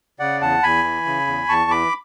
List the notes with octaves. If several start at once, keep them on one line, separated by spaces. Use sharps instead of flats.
C#3 D5 F#5
E2 F#5 A5
E2 G#5 B5
E3
C#3
E2
E2 A5 C#6
E3 B5 D6